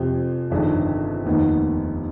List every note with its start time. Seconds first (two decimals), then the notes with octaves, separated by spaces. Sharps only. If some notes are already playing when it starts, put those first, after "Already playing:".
Already playing: F2 C3 F3 C4 G4
0.51 G1 F2 D#3 G#3 D4
1.25 F1 D#2 D#3 B3